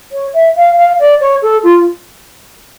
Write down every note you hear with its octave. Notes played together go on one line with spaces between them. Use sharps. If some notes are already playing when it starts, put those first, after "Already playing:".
C#5
E5
F5
F5
D5
C#5
A4
F4